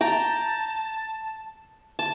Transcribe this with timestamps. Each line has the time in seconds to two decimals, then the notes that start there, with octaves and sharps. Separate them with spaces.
0.01 G5 A5 A#5
1.99 A5